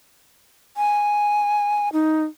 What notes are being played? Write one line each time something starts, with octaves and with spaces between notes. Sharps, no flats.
G#5
D#4